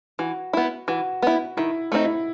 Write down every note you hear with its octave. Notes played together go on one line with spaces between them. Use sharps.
E3 F#4
B3 E4
E3 F#4
B3 E4
D#3 E4
A3 C4 D#4
E4